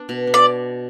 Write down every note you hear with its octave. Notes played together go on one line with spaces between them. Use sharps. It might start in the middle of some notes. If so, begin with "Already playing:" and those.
Already playing: B3 D4
B2
D4
D5